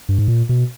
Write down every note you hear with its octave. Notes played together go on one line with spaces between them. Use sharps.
G2
G#2
A#2
B2